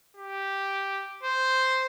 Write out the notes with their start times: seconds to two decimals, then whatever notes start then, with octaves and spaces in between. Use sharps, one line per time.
0.17 G4
1.23 C5